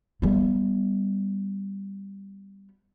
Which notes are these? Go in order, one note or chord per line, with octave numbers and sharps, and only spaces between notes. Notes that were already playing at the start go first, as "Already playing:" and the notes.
G3 B3